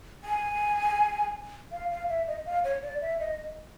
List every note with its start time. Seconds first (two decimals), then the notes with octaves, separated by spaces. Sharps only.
0.24 G#5
1.72 F5
1.91 F5
2.09 E5
2.27 D#5
2.46 F5
2.64 C#5
2.83 D5
3.01 E5
3.20 D#5